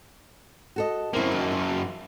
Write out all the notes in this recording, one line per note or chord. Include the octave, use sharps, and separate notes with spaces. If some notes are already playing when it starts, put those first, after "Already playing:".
F#4 A4 D#5
F#2 A#3 C4 E4
D#3
F4